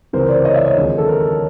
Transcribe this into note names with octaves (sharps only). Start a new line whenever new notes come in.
C#2 C3 E3 A#4 C5
C5 D5
C#5 D#5
D5 E5
C#5 D#5
D#2 D3 F3 G#3 C4
A4
A#4